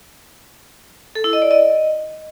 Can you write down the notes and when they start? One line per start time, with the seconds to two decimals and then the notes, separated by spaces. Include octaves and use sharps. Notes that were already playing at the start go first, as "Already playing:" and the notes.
1.15 A4
1.24 E4
1.33 D#5
1.42 D5
1.51 D#5